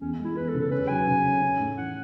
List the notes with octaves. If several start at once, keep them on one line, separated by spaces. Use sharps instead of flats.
E2 C#4
G#3
E4
E2 B4
A4
C#3
A4
C#4 B4
F#3 G#5
C#3
C#4
C#4
A2
E3 F#5